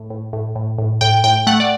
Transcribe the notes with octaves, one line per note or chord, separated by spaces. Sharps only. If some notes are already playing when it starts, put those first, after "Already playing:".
Already playing: A2
A2
A2
A2
A2
A2 G5
A2 G5
A3 F#5
D5